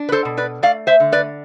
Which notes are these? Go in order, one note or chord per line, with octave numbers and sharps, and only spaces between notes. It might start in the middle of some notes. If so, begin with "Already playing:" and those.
Already playing: D4
B4
A4 C5
B2
B4 D5
A3 D5 F5
C5 E5
D3
B4 D5